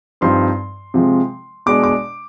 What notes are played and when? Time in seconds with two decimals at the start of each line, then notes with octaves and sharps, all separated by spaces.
0.21 G2 F3 C4 D#4 C6
0.94 C3 F3 G#3
1.66 B2 G#3 D4 D6
1.84 D6